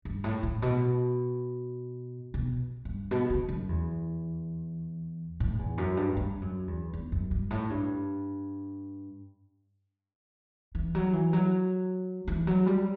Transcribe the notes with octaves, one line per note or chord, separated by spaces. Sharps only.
G2
A2
A2
B2
B2
G2
B2
C#3
F#2
E2
A2
E2
F#2
G2
G2
F#2
E2
E2
F#2
G2
A2
G2
E3
F#3
E3
F#3
E3
F#3
G3